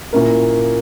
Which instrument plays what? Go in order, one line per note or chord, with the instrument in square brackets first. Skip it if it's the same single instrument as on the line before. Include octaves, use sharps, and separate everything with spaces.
[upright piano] A#2 A#3 C#4 E4 A#4